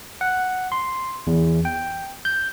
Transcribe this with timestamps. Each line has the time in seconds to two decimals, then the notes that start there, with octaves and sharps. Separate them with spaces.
0.21 F#5
0.72 C6
1.27 E2
1.65 G5
2.25 G6